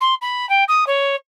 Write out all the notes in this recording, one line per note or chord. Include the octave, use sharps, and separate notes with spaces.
C6
B5
G5
D#6
C#5